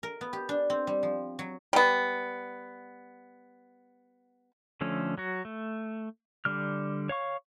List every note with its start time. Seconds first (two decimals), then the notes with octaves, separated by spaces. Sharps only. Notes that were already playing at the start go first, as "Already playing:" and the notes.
0.03 A#4
0.21 B3
0.33 G4
0.49 D4
0.70 C4
0.87 G3
1.03 F3
1.39 F#3
1.73 G3 B3
4.81 D3 F3 A3 C#4
5.18 F#3 F#4
5.45 A3
6.45 D3 G3 F6
7.09 C#5 F5 C#6